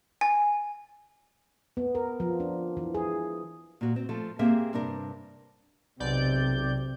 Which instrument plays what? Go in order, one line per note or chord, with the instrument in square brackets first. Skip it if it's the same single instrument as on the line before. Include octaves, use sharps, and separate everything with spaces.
[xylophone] G#5
[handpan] B3
A#4
F3
D4
E3
G#4
[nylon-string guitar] A#2 F#4
C4
F3 A3 A4
A#3 C4 G4 G#4 A#4 E5
G2 C3 D4 A#4
[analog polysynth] B1 D5 G6 [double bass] C3